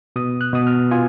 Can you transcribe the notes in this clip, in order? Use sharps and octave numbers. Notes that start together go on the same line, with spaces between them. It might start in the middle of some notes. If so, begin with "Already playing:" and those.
B2 D#6
F#6
B2 D#6
F6
F4 G#5